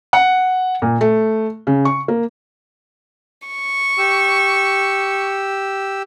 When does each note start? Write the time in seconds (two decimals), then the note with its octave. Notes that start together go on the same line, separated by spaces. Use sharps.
0.13 F#5
0.82 A#2
1.01 A3
1.67 C#3
1.85 C#6
2.08 A#3
3.48 C#6
3.98 G4 E6